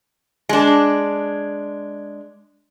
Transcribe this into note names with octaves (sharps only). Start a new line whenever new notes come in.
G#3 D4